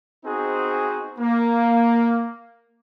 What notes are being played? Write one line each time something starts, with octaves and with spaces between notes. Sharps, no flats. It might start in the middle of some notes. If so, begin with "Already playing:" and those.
B3 C4 D#4 F#4 G#4 C5
A#3